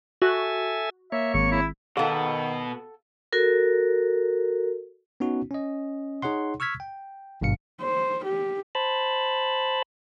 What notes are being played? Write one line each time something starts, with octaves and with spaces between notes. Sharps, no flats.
F#4 A4 E5 G#5
A#3 C#5 E5
G#1 C#6
E4
B2 D#3 B3 G#4 A4 F5 F#5
F#4 A4 A#4
B3 C#4 D#4 F#4
C#4 D#5
D#4 G#4 C#5 F#5 C6
C#6 E6 F6 G#6 B6
G5
G#1 G2 B2 F5 C#7
C5
G4
C5 A5 B5